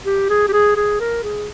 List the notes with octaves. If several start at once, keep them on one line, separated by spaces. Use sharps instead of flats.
G4
G#4
G4
G#4
G#4
A#4
G#4